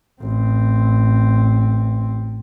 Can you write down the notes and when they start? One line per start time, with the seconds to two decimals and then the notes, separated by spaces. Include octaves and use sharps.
0.21 A1 C4